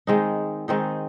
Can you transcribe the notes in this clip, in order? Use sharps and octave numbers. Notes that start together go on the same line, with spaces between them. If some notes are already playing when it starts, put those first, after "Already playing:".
D#3 G#3 C4 D#4
D#3 G#3 C4 D#4